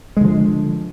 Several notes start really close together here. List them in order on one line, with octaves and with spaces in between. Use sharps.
G#3 D3 F3